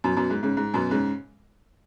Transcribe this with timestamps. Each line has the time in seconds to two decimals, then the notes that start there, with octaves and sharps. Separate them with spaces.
0.04 F#2 B2
0.17 F#2 B2
0.30 G#2
0.43 G#2 C#3
0.57 G#2
0.74 F#2 B2
0.91 G#2 C#3